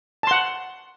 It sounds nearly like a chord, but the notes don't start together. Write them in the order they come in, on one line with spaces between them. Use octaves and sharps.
A5 C6 F#5